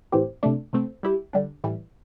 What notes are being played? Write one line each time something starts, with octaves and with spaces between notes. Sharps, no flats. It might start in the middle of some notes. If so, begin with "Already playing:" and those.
A2 E3 C4 G4
C3 A3 D4
C3 A3 C4
G3 E4 G4
D3 G3 D4
A2 E3 G3